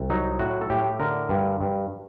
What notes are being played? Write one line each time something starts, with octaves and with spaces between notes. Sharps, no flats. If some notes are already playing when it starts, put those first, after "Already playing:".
Already playing: C2
F#3 D#4
A2 F#4
A4
A2 G4
D3 A#4
G2
G2